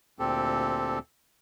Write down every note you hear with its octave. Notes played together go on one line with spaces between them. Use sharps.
D2 A#2 C4 G4 A4